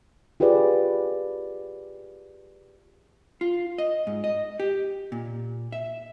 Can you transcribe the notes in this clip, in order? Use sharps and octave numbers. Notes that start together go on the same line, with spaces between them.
F4 G4 G#4 B4 D5
F4
D#5
G#2
D#5
G4
A#2
E5